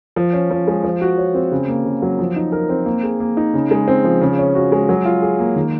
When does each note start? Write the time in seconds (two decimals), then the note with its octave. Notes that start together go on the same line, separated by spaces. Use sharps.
0.16 F3
0.33 C#4
0.50 F3
0.67 G#3
0.84 F3
1.01 F#4
1.18 C#5
1.34 C4
1.52 C#3
1.68 A#3
1.85 C#3
2.02 F#3
2.19 F3
2.36 D#4
2.52 A#4
2.69 C4
2.86 A#3
3.03 G#4
3.20 A#3
3.37 D#4
3.54 C#3
3.71 G#3
3.88 C4
4.04 F3
4.21 C#3
4.38 C#4
4.55 F#4
4.72 G#3
4.89 F#3
5.05 F4
5.22 G#4
5.39 A#3
5.56 D#3